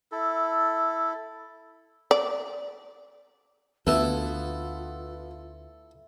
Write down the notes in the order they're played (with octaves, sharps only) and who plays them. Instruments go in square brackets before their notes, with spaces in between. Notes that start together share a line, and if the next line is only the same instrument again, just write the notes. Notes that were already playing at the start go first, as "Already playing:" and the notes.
[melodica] E4 A4
[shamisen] D5
[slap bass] D2 [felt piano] B3 [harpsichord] E4 A4 [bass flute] F4